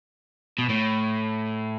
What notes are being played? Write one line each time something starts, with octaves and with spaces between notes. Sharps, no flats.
B2
A2